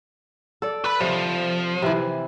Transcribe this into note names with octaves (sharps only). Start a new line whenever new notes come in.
A4 D5
B4 B5
C3 F3
C3 E3